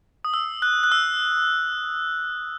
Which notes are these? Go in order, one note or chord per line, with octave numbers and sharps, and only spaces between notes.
D#6
E6
F#6
F#6
E6